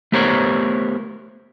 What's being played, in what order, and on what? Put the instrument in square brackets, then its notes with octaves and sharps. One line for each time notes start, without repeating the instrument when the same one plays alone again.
[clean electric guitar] A3 B3 G4 A#4 C5 C#5